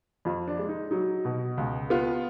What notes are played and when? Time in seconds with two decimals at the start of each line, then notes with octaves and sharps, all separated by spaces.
0.25 F2 F4
0.48 D4
0.59 G#3
0.69 D#4
0.91 F#3 D#4
1.25 B2
1.57 C#2
1.90 B3 F4